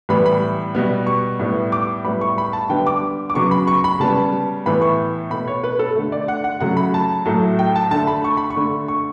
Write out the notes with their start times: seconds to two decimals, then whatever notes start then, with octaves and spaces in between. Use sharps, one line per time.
0.09 A2 E3 G3 B3 B5
0.26 B5
0.75 B2 G3 B3
1.07 C#6
1.40 A2 G3 B3
1.72 D6
2.05 A2 G3 B3 B5
2.21 C#6
2.38 B5
2.53 A5
2.69 D3 G3 B3 G5
2.87 D6
3.30 D6
3.35 C#3 F#3 B3 C#6
3.51 B5
3.67 C#6
3.84 B5
4.00 C#3 G3 B3 A5
4.66 A2 E3 B3 B5
4.82 C#6
5.30 B2 A3 B5
5.48 C#5
5.64 B4
5.79 A4
5.96 D3 A3
6.12 D5
6.28 F#5
6.44 F#5
6.60 C#3 F#3 A3 F#5
6.77 B5
6.94 A5
7.26 A2 F#3 A3
7.59 G5
7.76 A5
7.91 D3 A3 A5
8.07 B5
8.24 C#6
8.37 B5
8.50 C#6
8.57 D3 A3
8.88 C#6